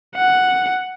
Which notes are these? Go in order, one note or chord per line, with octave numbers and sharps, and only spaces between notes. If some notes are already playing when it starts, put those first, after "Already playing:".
F#5